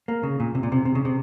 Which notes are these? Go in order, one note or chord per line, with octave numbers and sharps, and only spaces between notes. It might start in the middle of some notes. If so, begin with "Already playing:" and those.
A#3
C#3
A#2
C3
A#2
C3
C3
C#3
C3